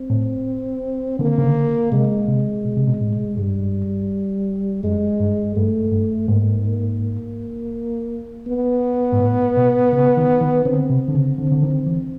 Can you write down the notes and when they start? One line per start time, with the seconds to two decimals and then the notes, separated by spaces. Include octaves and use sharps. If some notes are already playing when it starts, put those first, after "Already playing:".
Already playing: C4
0.10 A2
1.19 D3 A#3
1.38 C#3
1.43 D3
1.92 C3 G#3
2.28 C3
2.65 B2
2.77 C3
2.88 B2
3.01 A2
3.37 G2 G3
4.83 F#2 G#3
5.19 G2
5.56 G2 A3
5.92 G2
6.28 G#2 A#3
6.65 A#3
8.47 B3
9.12 G#2
9.20 A2
9.57 B2
9.93 C#3
10.17 D#3
10.41 D#3
10.65 D3 C4
10.90 C3
11.09 D3
11.14 C#3
11.38 D3
11.52 D3
11.62 D#3
11.86 E3